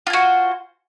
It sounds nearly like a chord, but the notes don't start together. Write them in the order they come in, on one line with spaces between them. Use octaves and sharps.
F4 G#5 F#4 C5